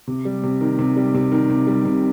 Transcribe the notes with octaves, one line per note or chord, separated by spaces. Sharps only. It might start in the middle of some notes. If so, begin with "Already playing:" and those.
C3
G3
C3
D#3
C3
G3
C3
D#3
C3
G3
C3